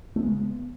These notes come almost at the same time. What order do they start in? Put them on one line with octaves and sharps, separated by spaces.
A3 B3 G#3 C#3